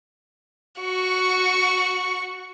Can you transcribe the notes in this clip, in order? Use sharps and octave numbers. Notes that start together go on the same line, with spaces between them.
F#4 C#6